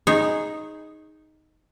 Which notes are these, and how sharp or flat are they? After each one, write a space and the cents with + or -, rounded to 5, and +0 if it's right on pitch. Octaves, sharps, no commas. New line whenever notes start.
D#4 +0 G#4 +0 C#5 -30